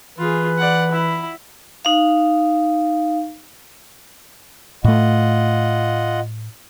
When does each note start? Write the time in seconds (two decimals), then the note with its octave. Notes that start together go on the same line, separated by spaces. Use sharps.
0.19 E3 F4 G#4 B4
0.58 D5 F#5
0.91 E4 B5
1.85 D#4 F5
4.84 A2 A3 F4 D#5 F#5